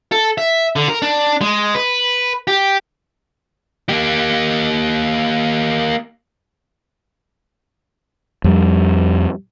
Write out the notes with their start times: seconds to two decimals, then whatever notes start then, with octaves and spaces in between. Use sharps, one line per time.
0.12 A4
0.38 E5
0.76 D3
0.89 A#4
1.02 D4
1.41 G#3
1.75 B4
2.48 G4
3.89 A#3 G4
8.44 F2 G3